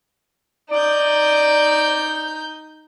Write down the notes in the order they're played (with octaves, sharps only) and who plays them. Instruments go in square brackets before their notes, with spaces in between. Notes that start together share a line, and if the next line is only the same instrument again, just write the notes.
[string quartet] D#4 G6 [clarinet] D5